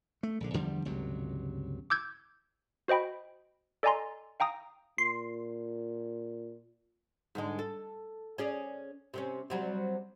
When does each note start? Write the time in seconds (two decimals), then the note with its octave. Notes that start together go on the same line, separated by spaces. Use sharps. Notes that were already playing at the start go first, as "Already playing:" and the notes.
0.23 A3
0.40 A#1 D3
0.54 E2 D3 F3 G3
0.85 G1 C#2 C3 F#3
1.90 D6 E6 G6 G#6
2.88 F#4 C5 D#5 G5 B5
3.83 A4 D5 D#5 G#5 A#5 C6
4.40 F5 G5 A#5 D#6
4.98 A#2 C6
7.35 G#2 D3 G#3
7.59 A4
8.38 C#4 G#4 D5
9.14 C3 C4 C#4
9.50 C3 F#3 G3